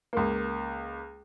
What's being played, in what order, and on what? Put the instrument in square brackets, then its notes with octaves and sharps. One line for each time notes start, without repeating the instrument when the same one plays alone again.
[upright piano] C#2 A#3